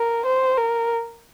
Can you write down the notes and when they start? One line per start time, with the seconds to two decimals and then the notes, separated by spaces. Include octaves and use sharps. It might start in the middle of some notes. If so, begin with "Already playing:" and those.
Already playing: A#4
0.25 C5
0.57 A#4